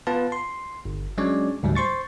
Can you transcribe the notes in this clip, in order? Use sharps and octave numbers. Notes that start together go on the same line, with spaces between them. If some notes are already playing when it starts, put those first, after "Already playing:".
B3 F4 B4 A5
C6
G1
F#3 G#3 C#4 D4 C#5 D5
D2 G#2 F#3 G3
C5 C6 C#6 A6